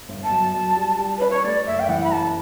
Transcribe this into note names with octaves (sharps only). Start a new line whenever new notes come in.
G1
A5
F#2
F#2
G3
G3
C#4 B4
C#5
A3 D5
F#1 E5
G5
E3 F#5
B5
F#1 A5